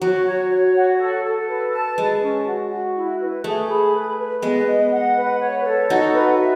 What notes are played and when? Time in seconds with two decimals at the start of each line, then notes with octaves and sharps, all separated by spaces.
0.01 F#3 F#4
0.26 C#5
0.51 C#5
0.75 F#4
0.99 A4
1.24 A4
1.48 B4
1.73 A5
1.98 G#3 B4
2.22 C#4
2.47 F#4
2.71 F#4
2.96 E4
3.20 B4
3.44 A3 G#4
3.69 B5
3.94 B4
4.18 B4
4.42 G#3 B3 D#5
4.67 D#5
4.92 F#5
5.16 B4
5.40 C#5
5.65 A4
5.90 D#4 F#4 F#5
6.14 B4
6.39 E5